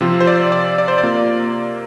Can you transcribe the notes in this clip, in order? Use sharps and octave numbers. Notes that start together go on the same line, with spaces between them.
C3 F3 C4 F4
C5
D5
D5
D5
C5
D5
C3 A#3 F4